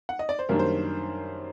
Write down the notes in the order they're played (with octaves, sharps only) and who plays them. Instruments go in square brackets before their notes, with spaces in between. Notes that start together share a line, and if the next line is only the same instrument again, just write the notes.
[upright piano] F#5
D#5
D5
C5
F#2 D#3 G3 A#3 D4 A#4
C5